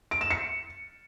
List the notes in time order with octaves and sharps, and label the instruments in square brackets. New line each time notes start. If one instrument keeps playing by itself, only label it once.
[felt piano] D7
E7
C#7